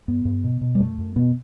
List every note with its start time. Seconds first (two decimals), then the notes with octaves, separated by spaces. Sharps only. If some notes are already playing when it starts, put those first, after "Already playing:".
0.08 G2 B3
0.25 G2
0.44 B2
0.61 B2
0.75 G3
0.80 F#2 A3
0.98 F#2
1.16 B2 B3